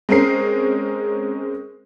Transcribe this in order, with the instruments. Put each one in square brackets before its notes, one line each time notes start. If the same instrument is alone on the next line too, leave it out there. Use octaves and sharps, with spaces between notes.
[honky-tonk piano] G#3 C4 C#4 A#4 C7